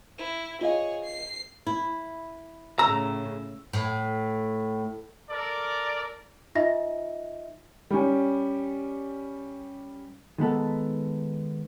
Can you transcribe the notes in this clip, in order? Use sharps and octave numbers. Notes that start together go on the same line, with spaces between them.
E4
F4 G#4 C#5 D#5 F5
C7
E4
A2 C#3 A#5 E6
A2
A4 A#4 D5
D#4 F4 D#5 E5 A#6
G3 C#4
D#3 G#3 B3 A4